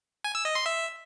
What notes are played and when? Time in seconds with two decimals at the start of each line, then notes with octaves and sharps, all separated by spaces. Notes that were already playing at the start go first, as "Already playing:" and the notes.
0.24 G#5
0.35 E6
0.45 D#5
0.55 C6
0.66 E5